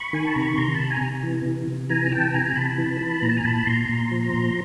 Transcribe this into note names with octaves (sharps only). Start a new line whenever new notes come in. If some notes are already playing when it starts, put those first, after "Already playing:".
Already playing: B5 C#6
D#3 G#5
A5
C3 A#5
B5
C3 A#5 C6
A5 B5
C3
G#5 A#5
C3
E3
C3
C3
E3 G#5 A#5
E3 G5 A5
C3 G#5 A#5
C3 A5 B5
E3
E3
A#2 A#5
A5
G#5 A#5
A#2 A5 B5
A#2 A#5 C6
A#2
F3
A#2